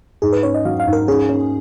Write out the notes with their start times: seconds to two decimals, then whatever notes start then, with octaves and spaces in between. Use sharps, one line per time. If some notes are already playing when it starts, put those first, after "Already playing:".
0.22 G#2 G#4
0.33 B4
0.43 C#4 C#5
0.54 D#5
0.65 F#3 F5
0.80 F5
0.87 G#2
0.93 A#4
1.08 C#4 G#4
1.29 C#4